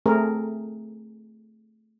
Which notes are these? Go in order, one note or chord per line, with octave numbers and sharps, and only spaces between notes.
A3 C4 G#4 A#4